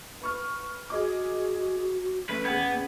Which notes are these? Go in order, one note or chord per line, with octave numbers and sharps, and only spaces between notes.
B4 C#6 F6
F#4 G#4 D#5 D6
A3 C#4 B4
E2 B3 G5 G#6